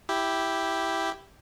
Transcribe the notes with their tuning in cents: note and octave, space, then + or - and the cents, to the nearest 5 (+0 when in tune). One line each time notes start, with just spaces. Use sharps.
E4 +0 G4 +0